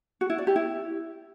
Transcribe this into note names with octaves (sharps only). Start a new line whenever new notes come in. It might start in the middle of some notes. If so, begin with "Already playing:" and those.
F#4
E4
D5
G4
E4